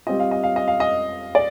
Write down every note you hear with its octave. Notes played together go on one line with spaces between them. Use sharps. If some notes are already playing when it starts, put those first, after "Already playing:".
G3 C4 F4 D#5
F5
D#5
F5
D#5
F5
D#5
D5